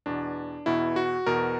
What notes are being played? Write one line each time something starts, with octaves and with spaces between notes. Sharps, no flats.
E2 B2 D4
E2 B2 E4
F#4
E2 B2 A#4